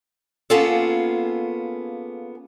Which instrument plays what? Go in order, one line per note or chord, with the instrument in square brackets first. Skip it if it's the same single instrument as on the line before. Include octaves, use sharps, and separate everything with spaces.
[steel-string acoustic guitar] A#3 B3 C#4 F4 G#4 A4